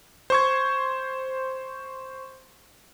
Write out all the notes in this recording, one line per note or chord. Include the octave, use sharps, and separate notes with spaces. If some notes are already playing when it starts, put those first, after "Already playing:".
C5 C#6 G#6